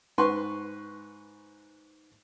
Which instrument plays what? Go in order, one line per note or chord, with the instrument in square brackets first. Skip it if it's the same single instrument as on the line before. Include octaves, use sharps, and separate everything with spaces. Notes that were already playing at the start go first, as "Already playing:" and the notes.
[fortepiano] G#2 B4 C6 C#6